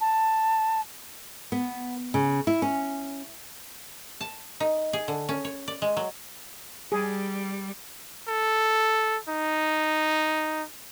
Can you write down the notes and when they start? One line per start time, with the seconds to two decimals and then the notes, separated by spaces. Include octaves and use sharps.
0.01 A5
1.52 B3
2.14 C#3
2.47 E4
2.62 C#4
4.21 A5
4.60 D#4
4.93 G#4
5.08 D3
5.29 C#4
5.45 C#5
5.68 D5
5.82 G#3
5.97 F#3
6.92 G3 G#4
8.28 A4
9.29 D#4